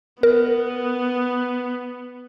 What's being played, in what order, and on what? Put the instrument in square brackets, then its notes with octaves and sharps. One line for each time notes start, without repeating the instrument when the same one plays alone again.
[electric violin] B3 [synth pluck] A#4